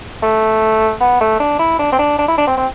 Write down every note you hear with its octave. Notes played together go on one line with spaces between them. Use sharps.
A3
B3
A3
D4
E4
D4
C4
D4
D4
E4
D4
C4
C4